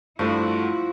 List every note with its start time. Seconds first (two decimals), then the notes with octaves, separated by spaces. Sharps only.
0.19 G2 F3 A3 E4 F#4